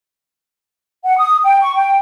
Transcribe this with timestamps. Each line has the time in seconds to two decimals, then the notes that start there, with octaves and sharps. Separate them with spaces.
1.05 F#5
1.17 D#6
1.43 G5
1.61 C#6
1.75 G5